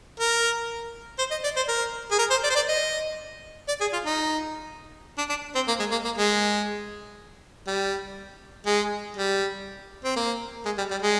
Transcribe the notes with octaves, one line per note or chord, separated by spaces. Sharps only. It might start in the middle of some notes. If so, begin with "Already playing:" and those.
A#4
C5
D#5
D5
C5
A#4
G#4
A#4
C5
D5
C5
D5
D#5
D5
G#4
F4
D#4
D4
D4
C4
A#3
G#3
A#3
A#3
G#3
G3
G#3
G3
C4
A#3
G#3
G3
G3
G#3